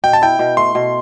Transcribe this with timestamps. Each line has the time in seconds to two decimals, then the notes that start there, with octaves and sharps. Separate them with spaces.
0.04 B2 G5
0.13 A5
0.22 E4 G5
0.39 B2
0.57 A3 C6
0.75 B2